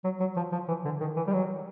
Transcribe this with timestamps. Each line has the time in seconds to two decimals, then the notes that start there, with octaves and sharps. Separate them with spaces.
0.04 F#3
0.20 F#3
0.37 F3
0.52 F3
0.68 E3
0.85 D3
1.00 D#3
1.17 E3
1.27 G3
1.33 F#3